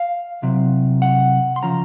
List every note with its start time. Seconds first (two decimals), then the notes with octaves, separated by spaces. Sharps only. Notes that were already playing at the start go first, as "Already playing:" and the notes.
Already playing: F5
0.42 C2 C3 F#3
1.02 F#5
1.56 C6
1.63 C#3 F3 A#5